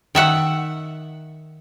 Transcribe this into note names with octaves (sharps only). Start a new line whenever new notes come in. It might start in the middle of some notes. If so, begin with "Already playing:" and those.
D#3 E5 F#5